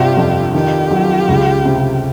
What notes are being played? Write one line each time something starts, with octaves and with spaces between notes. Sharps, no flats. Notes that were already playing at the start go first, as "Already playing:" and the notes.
Already playing: G2 C3 F4 G4
F2
D#3 F4 G4
F#3
C#2
C3